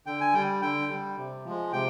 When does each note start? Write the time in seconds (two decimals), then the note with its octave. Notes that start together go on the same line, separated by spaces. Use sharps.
0.06 D3 G5
0.20 G#5
0.33 G3 G5
0.62 D3 G5
0.89 G3
1.17 C3
1.44 F3 G#3
1.72 C3 G5